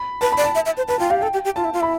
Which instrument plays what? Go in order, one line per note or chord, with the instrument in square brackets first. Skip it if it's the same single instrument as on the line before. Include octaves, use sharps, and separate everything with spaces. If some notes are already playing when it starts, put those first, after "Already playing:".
Already playing: [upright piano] B5
[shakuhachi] B4 [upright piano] A5
[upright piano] B5
[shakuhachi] D5
[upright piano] A5
[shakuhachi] E5
E5
C5
[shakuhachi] B4 [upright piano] A5
[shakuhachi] F4 [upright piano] G5
[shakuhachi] G4 [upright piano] F5
[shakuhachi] A4 [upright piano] G5
[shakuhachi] G4
G4
[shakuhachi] F4 [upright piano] A5
[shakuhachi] E4
F4
[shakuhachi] E4 [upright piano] B5